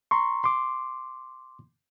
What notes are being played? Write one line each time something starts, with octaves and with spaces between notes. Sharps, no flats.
A#5 C6 C#6
C6 D6